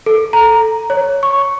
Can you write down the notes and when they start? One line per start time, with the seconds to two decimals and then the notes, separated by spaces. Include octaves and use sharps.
0.06 A4
0.33 A#5
0.90 C#5
1.23 C#6